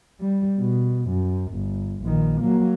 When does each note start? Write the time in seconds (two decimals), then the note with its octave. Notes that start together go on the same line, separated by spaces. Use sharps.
0.20 G3
0.60 B2
1.09 F#2
1.53 G1
2.03 A#1 D#3
2.41 F#3 A#3